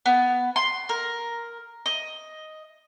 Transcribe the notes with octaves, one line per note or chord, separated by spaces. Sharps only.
B3
C6
A#4
D#5